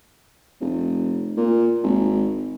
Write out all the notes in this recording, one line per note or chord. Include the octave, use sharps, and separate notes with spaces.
F1
A#2
G#1